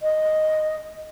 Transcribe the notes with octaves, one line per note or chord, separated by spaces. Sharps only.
D#5